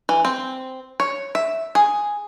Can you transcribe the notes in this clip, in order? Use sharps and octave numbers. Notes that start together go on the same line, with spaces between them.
E3
C4
C#5
E5
G#4